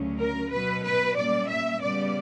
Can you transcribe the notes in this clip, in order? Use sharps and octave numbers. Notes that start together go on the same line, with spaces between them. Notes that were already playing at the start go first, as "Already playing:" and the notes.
Already playing: D2 C#3 F#3 C#4
A#4
B2 F#3 B3 B4
B4
A#2 G3 A#3 C#4 D5
E5
C#3 G3 B3 D5